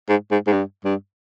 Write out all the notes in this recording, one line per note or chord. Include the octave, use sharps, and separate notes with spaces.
G#2
G#2
G#2
G2
G2